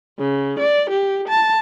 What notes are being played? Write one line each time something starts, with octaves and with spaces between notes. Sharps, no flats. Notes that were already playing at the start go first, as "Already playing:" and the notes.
C#3
D5
G4
A5